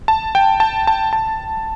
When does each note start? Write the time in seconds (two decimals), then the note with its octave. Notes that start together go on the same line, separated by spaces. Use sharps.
0.08 A5
0.35 G5
0.60 A5
0.87 A5
1.13 A5